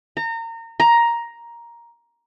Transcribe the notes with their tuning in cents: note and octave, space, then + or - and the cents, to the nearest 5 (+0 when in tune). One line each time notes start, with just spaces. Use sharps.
A#5 -30
A#5 +10